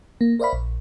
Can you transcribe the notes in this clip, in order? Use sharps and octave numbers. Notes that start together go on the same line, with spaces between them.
A#3
A#4 C5 D5 E5 F5 B5
A#1